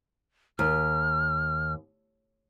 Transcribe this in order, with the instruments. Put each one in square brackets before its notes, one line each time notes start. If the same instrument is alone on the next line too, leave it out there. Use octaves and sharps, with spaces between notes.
[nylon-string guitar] D#2 [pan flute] F6